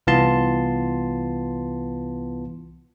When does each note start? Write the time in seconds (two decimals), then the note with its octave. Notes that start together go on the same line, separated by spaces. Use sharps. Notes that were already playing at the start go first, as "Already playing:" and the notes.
0.07 C2 E3 B3 F4 A5 C6